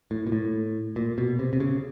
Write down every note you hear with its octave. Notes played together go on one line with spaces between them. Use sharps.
A2
A#2
A2
A#2
B2
C3
C3
C#3